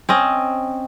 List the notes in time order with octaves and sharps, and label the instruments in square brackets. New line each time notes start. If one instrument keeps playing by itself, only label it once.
[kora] C4 C#4 D#5